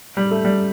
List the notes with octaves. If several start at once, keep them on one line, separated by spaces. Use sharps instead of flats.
G3
A3
G3